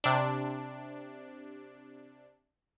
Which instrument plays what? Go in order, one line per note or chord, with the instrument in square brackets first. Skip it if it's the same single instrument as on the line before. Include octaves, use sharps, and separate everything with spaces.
[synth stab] C3 D4